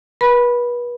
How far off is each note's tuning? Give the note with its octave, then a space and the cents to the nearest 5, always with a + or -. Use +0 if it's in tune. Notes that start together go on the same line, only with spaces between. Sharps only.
B4 -35 B5 -10